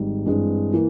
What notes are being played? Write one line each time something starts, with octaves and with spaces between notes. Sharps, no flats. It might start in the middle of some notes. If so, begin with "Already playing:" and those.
Already playing: G#1 G#2 G3
G2 E3 G#3 C4
E3 A#3